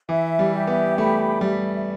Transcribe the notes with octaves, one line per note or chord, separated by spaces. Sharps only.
E3 E5
G3
G4
B3
A3 B5
G3 E5